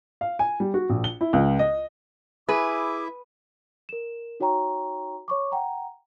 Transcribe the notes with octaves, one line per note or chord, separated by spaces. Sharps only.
F5
G#5
G3
F#4
A#1
G7
E4
C#2
D#5
E4 G#4 B4 E5 D6
A#4 E7
D#4 F#4 C#5 G5 A#5 C#6
C#5 C#6 D6
F#5 G5 A#5